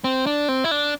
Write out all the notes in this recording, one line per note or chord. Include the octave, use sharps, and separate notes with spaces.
C4
D4
C4
E4
D4